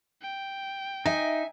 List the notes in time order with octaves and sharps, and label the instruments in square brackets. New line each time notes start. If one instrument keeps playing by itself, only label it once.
[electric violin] G5
[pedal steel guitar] D#4 [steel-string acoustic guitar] E5 G#5